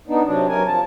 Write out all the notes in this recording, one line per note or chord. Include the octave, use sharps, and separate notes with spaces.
B3 D4 D#4
C3 F#3 D4
F#3 A#4 G#5
F3 A5